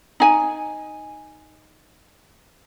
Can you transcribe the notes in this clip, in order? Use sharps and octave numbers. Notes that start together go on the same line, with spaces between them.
D#4 G#5